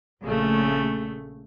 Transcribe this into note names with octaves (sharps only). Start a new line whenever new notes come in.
A#1 C#3 A3